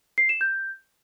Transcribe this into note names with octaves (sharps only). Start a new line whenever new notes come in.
C7
E7
G6